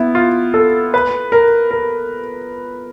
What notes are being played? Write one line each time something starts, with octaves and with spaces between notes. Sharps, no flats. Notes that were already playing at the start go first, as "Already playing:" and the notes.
Already playing: B3 E4
F4
A4
B4
A#4
A#4